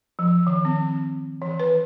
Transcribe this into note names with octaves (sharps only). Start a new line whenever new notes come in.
F3
D#3
C4
E3
B4